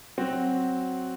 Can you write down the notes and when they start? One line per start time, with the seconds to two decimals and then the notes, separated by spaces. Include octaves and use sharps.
0.18 F#3 C4 F#4